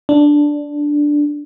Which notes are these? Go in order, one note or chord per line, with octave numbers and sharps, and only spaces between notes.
D4